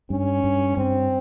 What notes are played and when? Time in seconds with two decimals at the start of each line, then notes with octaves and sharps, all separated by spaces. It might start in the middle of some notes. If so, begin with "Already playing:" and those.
0.10 G2 C#4
0.44 G2
0.77 G2 C4